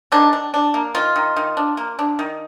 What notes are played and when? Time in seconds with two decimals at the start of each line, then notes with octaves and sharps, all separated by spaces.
0.12 D#3 D4
0.33 D4
0.54 D4
0.74 A#3
0.94 D#3 F4
1.16 D#3
1.36 D#3
1.57 D4
1.77 A#3
1.99 D4
2.19 D#3